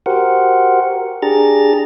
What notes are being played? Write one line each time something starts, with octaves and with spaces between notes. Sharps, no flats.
F#4 G4 A#4 C5 F#5
D4 G4 G#4 A#5 A6